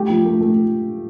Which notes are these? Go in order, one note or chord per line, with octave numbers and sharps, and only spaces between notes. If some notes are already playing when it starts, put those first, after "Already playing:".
Already playing: A3 G4
F3
A3
A3